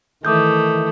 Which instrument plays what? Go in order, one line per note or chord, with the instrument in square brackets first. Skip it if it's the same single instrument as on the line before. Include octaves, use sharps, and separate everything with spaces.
[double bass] D#3 E3 [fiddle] A3 [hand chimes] D6 D#6 G6